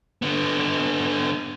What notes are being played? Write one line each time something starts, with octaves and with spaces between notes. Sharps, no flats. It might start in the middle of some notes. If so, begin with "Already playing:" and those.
D3 B3